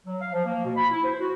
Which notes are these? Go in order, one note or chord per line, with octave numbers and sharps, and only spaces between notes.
F#3
F5
F3
A#3
B2
B5
E4
C5
F#4